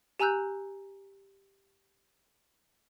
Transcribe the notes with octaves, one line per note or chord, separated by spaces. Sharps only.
G4 G#5 A#5 E6 F#6 G6